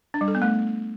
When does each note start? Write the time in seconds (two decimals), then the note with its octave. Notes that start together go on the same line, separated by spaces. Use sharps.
0.14 D4
0.21 G3
0.28 A4
0.35 B3
0.42 A3